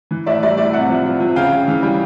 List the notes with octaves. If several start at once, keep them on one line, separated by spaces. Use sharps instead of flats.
E3
A2 D5 E5
G3 D5 E5
A2 D5 E5
C3 E5 F#5
F3
F3
F3
C#3 F5 G5
C#3
E3
G3